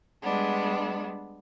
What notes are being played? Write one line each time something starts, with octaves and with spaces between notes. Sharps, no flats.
G3 G#3 B3 D4